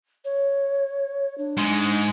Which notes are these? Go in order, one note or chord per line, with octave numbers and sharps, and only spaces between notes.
C#5
D4
G#2 G#3